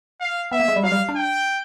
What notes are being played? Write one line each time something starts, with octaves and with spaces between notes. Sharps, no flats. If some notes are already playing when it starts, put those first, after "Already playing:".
F5
B3 E5
A#3
G#3
G3
F#3 F5
G3
D4
G5